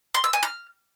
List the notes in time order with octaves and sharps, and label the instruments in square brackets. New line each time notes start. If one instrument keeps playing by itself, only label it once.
[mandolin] C6
E6
G#5
F6